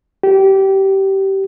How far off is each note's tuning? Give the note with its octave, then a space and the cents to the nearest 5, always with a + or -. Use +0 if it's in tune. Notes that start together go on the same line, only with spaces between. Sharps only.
G4 -20